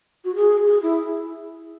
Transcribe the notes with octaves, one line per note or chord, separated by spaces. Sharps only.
F#4
G#4
G#4
E4